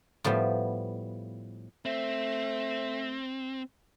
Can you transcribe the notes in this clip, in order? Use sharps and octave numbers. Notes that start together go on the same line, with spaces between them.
A2 F3 G3 B3
A3 C4